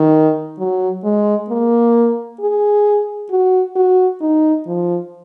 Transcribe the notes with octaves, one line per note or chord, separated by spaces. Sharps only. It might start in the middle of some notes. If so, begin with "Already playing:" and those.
Already playing: D#3
F#3
G#3
A#3
G#4
F#4
F#4
D#4
F3